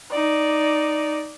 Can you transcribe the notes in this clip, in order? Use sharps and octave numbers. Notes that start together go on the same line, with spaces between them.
D#4 D5